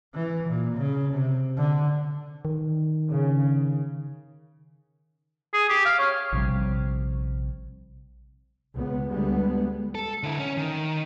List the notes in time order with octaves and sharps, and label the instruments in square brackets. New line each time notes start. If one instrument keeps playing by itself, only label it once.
[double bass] E3
A#2
C#3
C3
D3
[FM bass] D#3
[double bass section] C#3
[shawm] G#4
G4
F5
C#5
[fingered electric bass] A#1 C3 G3
[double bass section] C#2 B3
D2 G3 G#3 B3
[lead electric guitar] A4
D3 E4
C#4
D#3